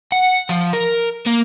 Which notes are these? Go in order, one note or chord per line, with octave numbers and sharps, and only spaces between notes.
F#5
F3
A#4
A#3